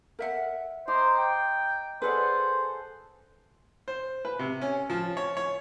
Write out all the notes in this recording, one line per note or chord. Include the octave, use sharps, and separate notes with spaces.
A#4 E5 F#5
C5 D#5 A#5 D6
G5
G#4 A4 B4 C5 D5 F#5
C5
B4
C3
C#4
F3
C#5
C#5